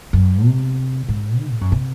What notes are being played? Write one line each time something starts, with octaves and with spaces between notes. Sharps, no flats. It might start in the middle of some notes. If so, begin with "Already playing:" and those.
F#2
C3
G#2
D#3
A2
F#2
C3